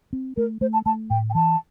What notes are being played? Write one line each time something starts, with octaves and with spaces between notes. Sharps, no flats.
C4
A3 A#4
A3 C5
A5
A3 A5
A2 G5
G5
E3 A5